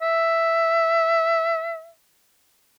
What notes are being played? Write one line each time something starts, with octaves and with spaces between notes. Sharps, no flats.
E5